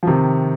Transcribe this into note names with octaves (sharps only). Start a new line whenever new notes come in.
F3
C3 D#3